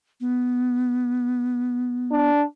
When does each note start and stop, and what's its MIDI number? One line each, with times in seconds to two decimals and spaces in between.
0.21 2.30 59
2.12 2.43 62